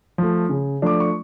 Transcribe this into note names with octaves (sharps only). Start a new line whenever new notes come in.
F3 A3
C#3
F3 A3 D4 D6
C#6